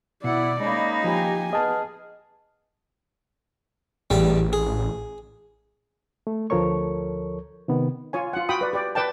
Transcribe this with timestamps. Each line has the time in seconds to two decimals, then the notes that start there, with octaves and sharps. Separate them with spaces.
0.24 B2 E4 D5 F#5
0.60 G#3 A#3 C#4 D#4 D#5 B5
1.04 F3 G4 G#5
1.53 B3 G#4 D#5 A5 F6
4.10 A1 E2 G3 D5
4.53 G#4
6.27 A3
6.50 D2 F3 A4 A#4 C#5 C#6
7.68 C3 D#3 B3
8.13 F4 C#5 G#5
8.33 F4 F#5
8.49 F#4 G5 B5 D#6
8.61 B4 D5
8.73 G4 D5
8.95 B4 D5 G5 A5